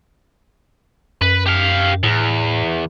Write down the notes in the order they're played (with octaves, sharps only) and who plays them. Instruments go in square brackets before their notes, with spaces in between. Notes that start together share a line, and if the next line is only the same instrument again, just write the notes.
[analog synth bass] F#2 [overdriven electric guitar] B4
[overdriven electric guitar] G4 F5
[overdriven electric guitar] E2 [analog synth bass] A2